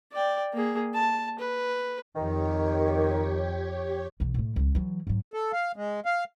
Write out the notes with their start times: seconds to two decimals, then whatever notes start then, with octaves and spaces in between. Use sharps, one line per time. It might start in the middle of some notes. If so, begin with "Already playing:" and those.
0.13 D5 G5
0.53 A#3 G#4
0.94 A5
1.39 B4
2.16 F2 D#3 G4 C#5
4.20 B1 E3
4.34 A2 A3
4.56 C#2 E3
4.75 E3 F#3
5.07 G#2 F#3
5.34 A4
5.53 F5
5.76 G#3
6.06 F5